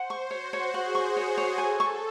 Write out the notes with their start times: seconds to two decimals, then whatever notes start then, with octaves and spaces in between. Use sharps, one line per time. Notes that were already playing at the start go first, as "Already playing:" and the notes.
Already playing: C5 F#5
0.10 C#6
0.31 F#4 C#5
0.53 C#5
0.74 G#4 F#5
0.95 C#6
1.16 G#4 C#5
1.38 C#5
1.58 A4 G#5
1.80 C#6